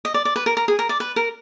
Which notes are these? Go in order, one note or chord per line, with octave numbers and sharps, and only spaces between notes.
D#5
D5
D5
B4
A#4
A#4
G#4
A#4
D5
B4
A#4